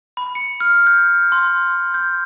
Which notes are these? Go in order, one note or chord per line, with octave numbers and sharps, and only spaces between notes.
B5
C#7
F6
G6
C6
G6